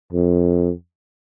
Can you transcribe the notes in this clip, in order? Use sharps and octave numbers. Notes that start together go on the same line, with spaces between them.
F2